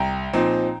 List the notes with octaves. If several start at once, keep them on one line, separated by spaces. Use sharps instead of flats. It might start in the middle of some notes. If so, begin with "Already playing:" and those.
Already playing: C2 G5 A#5
A#2 F3 C4 D#4